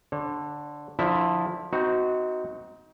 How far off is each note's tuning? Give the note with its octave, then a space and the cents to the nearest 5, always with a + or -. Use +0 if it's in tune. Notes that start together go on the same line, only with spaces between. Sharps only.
D3 +0 C#5 -45
D3 +0 F3 +15 E4 -10
C4 -20 D#4 +20 F#4 +0